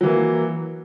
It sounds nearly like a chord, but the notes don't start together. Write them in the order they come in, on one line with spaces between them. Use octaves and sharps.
F#3 E3 A#3